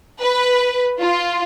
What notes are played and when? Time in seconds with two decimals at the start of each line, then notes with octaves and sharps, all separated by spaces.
0.21 B4
1.00 F4